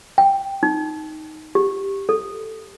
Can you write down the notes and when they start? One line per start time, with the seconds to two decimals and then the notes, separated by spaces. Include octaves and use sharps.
0.18 G5
0.63 D#4
1.55 G4
2.09 A4